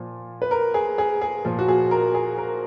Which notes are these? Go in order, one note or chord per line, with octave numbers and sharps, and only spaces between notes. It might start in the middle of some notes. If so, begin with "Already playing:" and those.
Already playing: A#2 F3
B4
A#4
G#4
G#4
G#4
A#2 F3
F#4
G#4
A#4
G#4
A#4